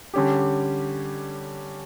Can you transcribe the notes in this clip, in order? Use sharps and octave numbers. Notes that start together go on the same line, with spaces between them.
D3 G3 C#4 G4